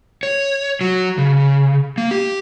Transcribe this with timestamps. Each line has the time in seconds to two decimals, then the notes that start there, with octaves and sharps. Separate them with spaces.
0.23 C#5
0.81 F#3
1.18 C#3
1.98 A#3
2.11 G4